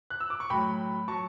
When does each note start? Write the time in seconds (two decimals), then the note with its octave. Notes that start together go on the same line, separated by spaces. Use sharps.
0.10 F#6
0.20 E6
0.30 D6
0.40 C#6
0.50 A2 F#3 G5 B5
1.08 F#3 A5 C#6